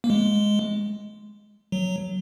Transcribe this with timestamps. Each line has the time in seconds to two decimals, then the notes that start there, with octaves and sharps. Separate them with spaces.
0.04 A#3
0.10 G#3
1.72 F#3